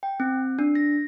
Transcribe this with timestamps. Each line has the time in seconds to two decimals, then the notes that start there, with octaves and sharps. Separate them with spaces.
0.03 G5
0.20 C4
0.59 D4
0.75 A#6